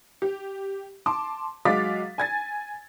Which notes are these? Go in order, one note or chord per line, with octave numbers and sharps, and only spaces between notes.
G4
A5 C6 D6
F#3 G#3 F5 D6 A6 B6
G#5 G#6 A6